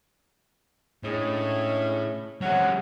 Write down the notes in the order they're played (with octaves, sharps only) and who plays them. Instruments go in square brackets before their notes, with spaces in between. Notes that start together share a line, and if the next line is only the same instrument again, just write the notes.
[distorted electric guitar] A2 [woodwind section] G#3 D4 G#4 [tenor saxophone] C#4
[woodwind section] C3 F3 [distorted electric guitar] F#3 G#3 [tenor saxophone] C#4 [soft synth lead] F#5